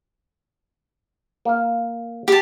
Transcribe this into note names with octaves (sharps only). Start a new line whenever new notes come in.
A#3 F5
G4 A5